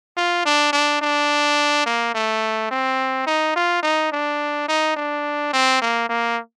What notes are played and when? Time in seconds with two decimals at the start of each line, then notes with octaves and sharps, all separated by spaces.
0.17 F4
0.45 D4
0.72 D4
1.02 D4
1.86 A#3
2.14 A3
2.71 C4
3.26 D#4
3.56 F4
3.83 D#4
4.12 D4
4.68 D#4
4.96 D4
5.53 C4
5.81 A#3
6.09 A#3